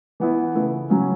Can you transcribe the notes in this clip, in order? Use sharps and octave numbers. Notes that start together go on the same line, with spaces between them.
E3 B3 E4
C#3 A3 E4 B4
C#3 F#3 C#4